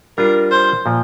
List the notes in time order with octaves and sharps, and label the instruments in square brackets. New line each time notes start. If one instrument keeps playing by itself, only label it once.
[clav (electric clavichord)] G3 D4 F4 [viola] A#4
[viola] C5
[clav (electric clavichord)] A#2 F3